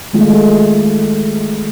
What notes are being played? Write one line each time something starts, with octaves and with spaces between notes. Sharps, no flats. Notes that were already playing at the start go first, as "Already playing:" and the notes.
D#3 G#3 A3 F4